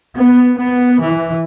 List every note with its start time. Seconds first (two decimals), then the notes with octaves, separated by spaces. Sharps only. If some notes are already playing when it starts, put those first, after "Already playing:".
0.15 B3
0.58 B3
1.02 E3